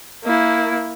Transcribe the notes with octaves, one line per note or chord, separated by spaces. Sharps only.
A#3 E4